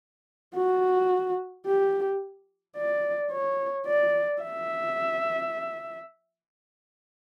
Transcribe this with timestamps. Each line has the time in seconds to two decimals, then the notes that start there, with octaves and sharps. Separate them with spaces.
0.56 F#4
1.66 G4
2.77 D5
3.32 C#5
3.87 D5
4.42 E5